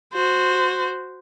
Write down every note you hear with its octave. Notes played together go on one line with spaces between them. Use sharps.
F#4 C5